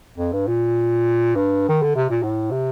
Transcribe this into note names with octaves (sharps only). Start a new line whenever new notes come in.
F2
G2
A#2
G2
D#3
D3
C3
A#2
A2
C3